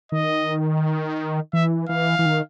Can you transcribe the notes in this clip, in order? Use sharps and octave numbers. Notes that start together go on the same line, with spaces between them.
D#3 D#5
E3 E5
E3 F5
E3
D#3